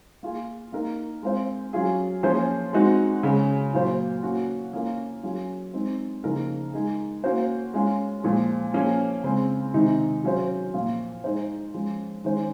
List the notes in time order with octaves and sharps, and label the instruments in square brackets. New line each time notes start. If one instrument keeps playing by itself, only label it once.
[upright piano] A#3 F4 G#4
A#3 D#4 A#4
G#3 C4 F4 C5
F#3 C#4 F4 G#4
F3 A#3 C#4 G#4 C5
G#3 C4 D#4 F#4
C#3 G#3 C#4
A#2 F#3 A#3 F4 C5
A#3 C#4 F#4
A#3 C#4 F4 A#4
F#3 C#4 F4 G#4
G#3 C4 D#4
C#3 F3 A#3 D#4 A#4
G#3 D#4 G#4
A#3 C#4 F#4 C5
G#3 C#4 F4
A#2 F3 G#3
F3 A#3 C#4 G#4
C#3 G#3 C4
C3 D#3 G#3 D#4
F#3 C#4 F4 G#4 C5
A#2 F3 A#3 F4
G#3 D#4 G#4 C5
F3 G#3 C#4
D#3 G#3 C#4 G#4 C5